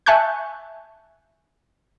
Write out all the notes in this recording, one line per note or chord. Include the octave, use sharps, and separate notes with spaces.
E5 G#5 A5 C#6 F#6 G6